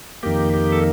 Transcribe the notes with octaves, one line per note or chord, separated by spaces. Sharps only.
F2 D#3 A#3 G4
G4
A4